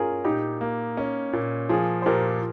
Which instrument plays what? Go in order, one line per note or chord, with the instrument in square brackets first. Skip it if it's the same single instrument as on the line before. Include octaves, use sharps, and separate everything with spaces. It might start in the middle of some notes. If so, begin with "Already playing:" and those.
Already playing: [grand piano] C#4 [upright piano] F4 G#4 A#4
[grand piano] A#2 [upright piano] D#4 G4
[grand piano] A#3
C#4
A#2
[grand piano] F3 [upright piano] F4 G#4
[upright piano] C5
[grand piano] A#2 [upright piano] G4 A#4